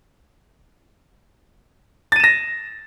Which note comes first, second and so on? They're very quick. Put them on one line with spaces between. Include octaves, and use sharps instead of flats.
A6 D#7 E7 A#6